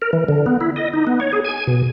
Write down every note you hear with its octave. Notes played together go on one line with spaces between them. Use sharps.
A#4
E3
D3
B3
E4
D#5
D#4
B3
C#5
G#4
G#5
B2